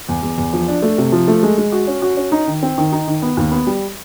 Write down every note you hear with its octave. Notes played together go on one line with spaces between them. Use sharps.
E2
E2
E2
F3
D4
A3
C3
F3
A3
G#3
G#3
F#4
C#4
F#4
C#4
D#4
D#3
C4
D#3
D#4
D#3
B3
D#2
B3
G3